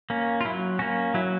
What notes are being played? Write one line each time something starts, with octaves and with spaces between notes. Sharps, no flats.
A#3 C#4
F4
F#3 E4
A#3 C#4 F#4
F#3 E4